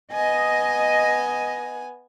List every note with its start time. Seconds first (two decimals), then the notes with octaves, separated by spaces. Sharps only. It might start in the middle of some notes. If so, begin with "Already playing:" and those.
0.12 B3 D#5 G#5